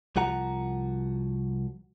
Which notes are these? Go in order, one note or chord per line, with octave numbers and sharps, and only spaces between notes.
C2 F3 F#4 F#5 A#5